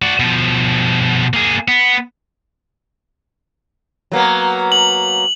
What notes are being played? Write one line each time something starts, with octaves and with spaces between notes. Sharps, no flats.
F#4 D5
B2 F3
A#3 G#4
B3
F#3 A#3 B3
F#7